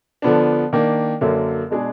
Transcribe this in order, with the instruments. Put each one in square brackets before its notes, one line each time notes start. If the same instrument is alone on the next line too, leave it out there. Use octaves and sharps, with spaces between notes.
[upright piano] D3 F3 B3 D4
D#3 A#3 D4
F#2 D3 F#3 A#3
B2 G#3 D4 G#4